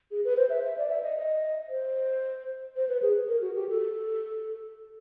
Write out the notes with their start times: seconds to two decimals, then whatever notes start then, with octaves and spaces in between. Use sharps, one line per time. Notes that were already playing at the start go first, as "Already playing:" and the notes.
0.11 G#4
0.24 B4
0.37 C5
0.50 E5
0.64 E5
0.78 D5
0.90 E5
1.03 D#5
1.17 D#5
1.69 C5
2.76 C5
2.89 B4
3.02 G#4
3.28 A#4
3.42 F#4
3.55 G4
3.69 A4